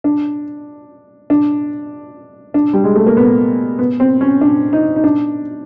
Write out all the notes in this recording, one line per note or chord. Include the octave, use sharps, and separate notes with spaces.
D4
D4
D4
G3
G#3
A3
A#3
B3
B3
C4
C#4
D4
D#4
D#4
D4